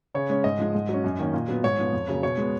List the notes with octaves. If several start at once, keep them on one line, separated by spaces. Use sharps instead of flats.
C#3 C#5
G#3 C#4
G#2 D#5
F3 G#3
G#2
F#3 C#4
F#2
D#3 A#3 C#4
A#2
F#3 B3
G#2 C#5
F3 B3
F2
C#3 F#3 A#3 C#4
B2 C#5
G#3 B3